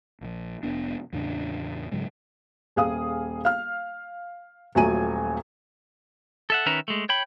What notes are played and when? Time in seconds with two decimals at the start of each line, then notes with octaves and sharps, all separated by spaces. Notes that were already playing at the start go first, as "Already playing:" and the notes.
0.21 A#1 F3
0.63 F1 B3 D4
1.13 E2 A2 C#3 D4
1.91 G#2 C#3 F#3 G#3
2.76 D#1 G#4 F5 D#6
3.45 F5 F6
4.75 D#1 A#2 F#3 A3 G#5 D#7
6.50 A4 E5 F#5
6.66 D#3 C#4 B4 E5 A#5
6.88 G#3 A3
7.09 C#5 G5 B5